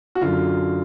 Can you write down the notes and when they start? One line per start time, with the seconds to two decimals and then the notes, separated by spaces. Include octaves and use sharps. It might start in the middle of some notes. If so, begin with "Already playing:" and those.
0.15 F#4
0.21 F#2 D3 F#3 F4